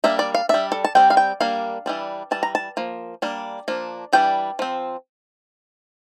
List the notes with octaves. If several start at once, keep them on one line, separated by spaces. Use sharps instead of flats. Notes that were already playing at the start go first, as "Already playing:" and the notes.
G3 A#3 D4 E5
D5
F5
G3 D4 E5
A4
A5
G3 C4 G5
F5
G5
G3 A#3 D4 F5
E3 G3 D4
E3 G3 A5
A#5
A5
F3 A#3
G3 A#3 D4
F3 A#3 D4
E3 G3 D4 G5
F3 C4